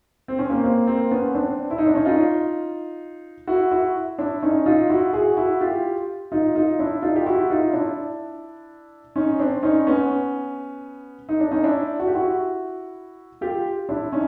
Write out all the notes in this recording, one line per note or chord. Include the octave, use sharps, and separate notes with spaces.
C4
C#4
A#3 C4
A#3 C4
A#3 C4
B3 C#4
C4 D4
E4
D#4
D4
C#4 D#4
D#4 F4
E4 F#4
E4 F#4
D4 E4
C#4 D#4
D#4 F4
E4 F#4
F#4 G#4
E4 F#4
F4 G4
D#4 F4
D#4 F4
D4 E4
D#4 F4
G4
E4 F#4
D#4 F4
D4 E4
C#4 D#4
C4 D4
C#4 D#4
B3 C#4
D#4
D4
C#4 D#4
D4 E4
F#4
G4
E4 F#4
F4 G4
D4 E4
C#4 D#4